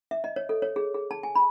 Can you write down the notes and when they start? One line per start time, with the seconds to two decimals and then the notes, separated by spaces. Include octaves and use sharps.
0.11 E5
0.24 D#5
0.36 C#5
0.49 A4
0.62 C#5
0.76 G#4
0.94 G#4
1.11 A5
1.23 G#5
1.35 B5